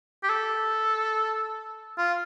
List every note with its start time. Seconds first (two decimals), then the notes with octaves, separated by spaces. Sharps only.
0.23 G4
0.29 A4
1.98 F4